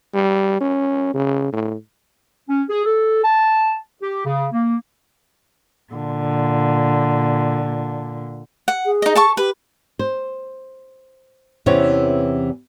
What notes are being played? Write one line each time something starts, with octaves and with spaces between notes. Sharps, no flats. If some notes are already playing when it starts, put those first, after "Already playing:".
G3
C#4
C#3
A2
C#4
G#4
A4
A5
G4
C#3
A#3
A#2 D3
F#5
G#4
D#4 D#5
A4 A5 C#6
G4 B4
C5
E2 C3 E3 C4 C#4 C#5